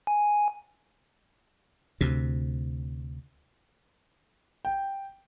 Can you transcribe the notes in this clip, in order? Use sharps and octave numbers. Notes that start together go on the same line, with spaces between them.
G#5
D2 C3
G5